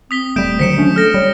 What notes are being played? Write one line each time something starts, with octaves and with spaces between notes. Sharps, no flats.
C4 D#6 B6 G7
D#1 G3 A3 G6 D7 E7
D3 D#3 F#3 C5 B6 C#7 E7
F#3 A3 C#4 D4
A4 F6 A#6
G3 C#5